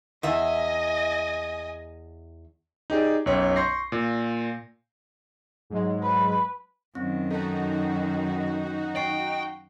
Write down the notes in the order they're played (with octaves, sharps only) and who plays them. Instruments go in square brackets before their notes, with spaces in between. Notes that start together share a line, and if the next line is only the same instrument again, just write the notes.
[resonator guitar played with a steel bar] E2 E5 [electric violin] D#5 G#5
[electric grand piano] D#4 G4 G#4 D5
B1 F#2 C#5 G5
C6 C#6 G6 A#6 C7
A#2
[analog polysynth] G#2 F#3 G#3
[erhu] B4
[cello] F#2 D#3 [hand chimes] C4
[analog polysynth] D#4 F#4 [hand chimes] A4 A5
[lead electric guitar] G5 [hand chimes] C#6 C7 D7